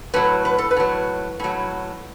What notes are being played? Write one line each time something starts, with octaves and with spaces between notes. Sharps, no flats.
A2 F#3 B4
B4
A4
B4
A2 F#3
A2 F#3